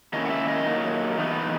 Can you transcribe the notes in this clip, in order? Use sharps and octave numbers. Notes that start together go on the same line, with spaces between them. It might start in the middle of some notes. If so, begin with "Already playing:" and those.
D#3 A#3 C#4 E4 D#5
F#5
E5
D#5
F#3 A#3 D#4
E3 B3 D#4